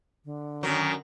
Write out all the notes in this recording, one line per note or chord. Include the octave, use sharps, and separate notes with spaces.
D3
F#2 D#3 F#3